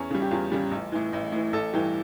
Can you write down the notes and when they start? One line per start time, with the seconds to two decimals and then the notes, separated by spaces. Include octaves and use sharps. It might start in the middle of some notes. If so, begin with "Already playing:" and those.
Already playing: E2 C#4
0.10 C#3 G3
0.22 G4
0.31 E2 F4
0.52 C#3 G3
0.71 A1
0.92 A2 E3
1.13 A1
1.32 A2 E3
1.53 A1 A4
1.73 G2 E3 G4